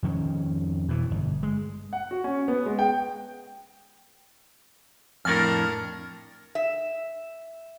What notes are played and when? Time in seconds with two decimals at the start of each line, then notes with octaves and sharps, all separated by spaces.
0.03 F2 D#3 C#4
0.89 B2 E3
1.11 G1
1.43 G#3
1.93 F#5
2.11 F#4
2.24 C#4
2.48 B3
2.66 G#3
2.79 G5
5.25 F2 A2 D4 A#4 F6
6.55 E5